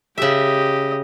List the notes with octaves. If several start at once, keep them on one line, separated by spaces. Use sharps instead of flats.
C#3 G4 D#5 E5